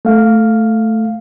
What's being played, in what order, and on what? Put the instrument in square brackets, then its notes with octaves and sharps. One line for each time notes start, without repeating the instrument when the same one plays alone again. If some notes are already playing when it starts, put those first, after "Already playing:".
[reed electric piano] A3 F5